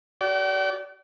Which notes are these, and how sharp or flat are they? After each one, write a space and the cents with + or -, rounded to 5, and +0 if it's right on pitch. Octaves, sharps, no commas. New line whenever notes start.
F#4 +35 D5 -25 G5 -45